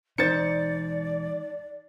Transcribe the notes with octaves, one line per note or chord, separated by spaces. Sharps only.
E3 G#3 D#4 C5 D5 A6 C#7